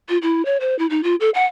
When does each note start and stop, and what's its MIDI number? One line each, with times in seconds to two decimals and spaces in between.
0.09 0.18 65
0.22 0.45 64
0.45 0.57 73
0.60 0.77 72
0.79 0.86 64
0.90 1.03 63
1.03 1.15 65
1.20 1.30 69
1.34 1.45 78